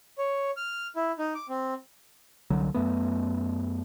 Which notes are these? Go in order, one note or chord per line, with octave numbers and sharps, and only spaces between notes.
C#5
F6
E4
D#4
D6
C4
C2 D3 F#3
F#2 A3 B3